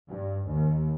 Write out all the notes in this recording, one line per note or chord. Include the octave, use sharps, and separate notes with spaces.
G2
D#2